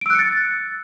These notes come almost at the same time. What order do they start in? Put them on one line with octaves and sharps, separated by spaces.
D7 E6 F#6 C#7 A6